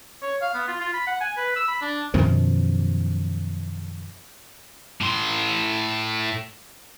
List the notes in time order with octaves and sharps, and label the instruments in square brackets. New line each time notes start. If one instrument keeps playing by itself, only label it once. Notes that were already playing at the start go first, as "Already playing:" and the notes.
[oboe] C#5
F5
B3
F4
F4
B5
F#5
G#5
B4
E6
B5
D4
[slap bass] F#2 B2 D#3 F3
[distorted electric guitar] A2 C6